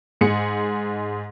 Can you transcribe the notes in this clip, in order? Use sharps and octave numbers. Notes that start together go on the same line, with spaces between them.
G#2 G#3 G#4 C#7